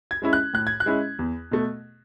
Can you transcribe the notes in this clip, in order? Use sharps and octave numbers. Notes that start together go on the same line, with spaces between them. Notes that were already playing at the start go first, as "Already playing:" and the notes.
G#6
G#3 C#4 E4
F#6
A2 F#6
G#6
F#6
G#3 C#4 E4
E2
B2 A3